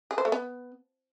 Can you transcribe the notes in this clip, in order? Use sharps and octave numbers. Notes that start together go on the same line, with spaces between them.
G#4
C5
A3
B3